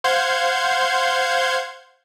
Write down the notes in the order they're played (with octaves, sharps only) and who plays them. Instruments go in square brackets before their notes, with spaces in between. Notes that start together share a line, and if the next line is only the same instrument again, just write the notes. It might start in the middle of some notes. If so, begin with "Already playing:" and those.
[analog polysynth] C5 F5 F#5 C6 G6 G#6